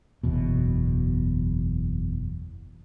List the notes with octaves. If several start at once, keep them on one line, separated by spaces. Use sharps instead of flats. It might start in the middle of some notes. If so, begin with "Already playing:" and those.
F#1 E2 B2